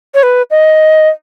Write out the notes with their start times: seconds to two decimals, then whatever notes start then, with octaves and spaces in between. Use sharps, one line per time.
0.14 C#5
0.23 B4
0.51 D#5